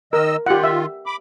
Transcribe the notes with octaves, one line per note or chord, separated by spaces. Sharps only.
D#3 A#4 D#5 E6
D#3 F4 G4 F#5
E5
B5 D6